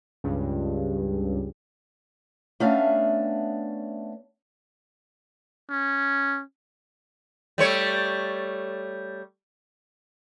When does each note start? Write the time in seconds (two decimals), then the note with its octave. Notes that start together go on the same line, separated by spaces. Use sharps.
0.24 C#2 G2
2.60 A3 B3 C#4 D4 E5 F5
5.70 C#4
7.58 G3 A3 C#5